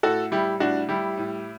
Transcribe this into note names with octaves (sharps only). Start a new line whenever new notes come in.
A2 F#4 A4
G3 E4 G4
A2 D4 F#4
G3 E4 G4
A2